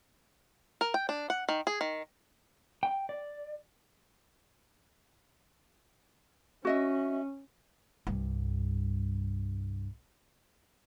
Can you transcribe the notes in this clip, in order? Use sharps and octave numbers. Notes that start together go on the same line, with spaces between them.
A#4
G5
D4
F#5
D#3
G#4
D#3
G5
D5
C#4 F#4 D#5 E5
C2 G2